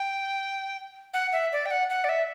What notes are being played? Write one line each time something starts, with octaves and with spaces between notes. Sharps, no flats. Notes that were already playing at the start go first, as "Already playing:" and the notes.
Already playing: G5
F#5
E5
D5
G5
F#5
F#5
D5
E5